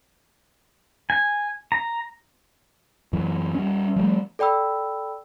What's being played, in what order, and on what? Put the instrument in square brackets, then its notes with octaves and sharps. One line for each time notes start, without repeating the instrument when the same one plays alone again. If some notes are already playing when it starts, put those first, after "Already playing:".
[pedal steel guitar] G#5
A#5
[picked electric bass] F#2 E3
G3 C#4
F3 G3 A3
[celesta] A4 D5 G5 B5 E6